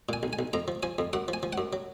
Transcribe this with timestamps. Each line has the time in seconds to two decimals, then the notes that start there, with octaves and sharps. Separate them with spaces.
0.09 A#2 G#5
0.23 B1
0.33 G#5
0.39 B1
0.53 F2 A#5
0.68 F3
0.83 F3 G#5
0.98 F2
1.13 F#2 F#5
1.28 F3
1.33 G#5
1.43 F3
1.53 F#5
1.58 F#2
1.73 F#3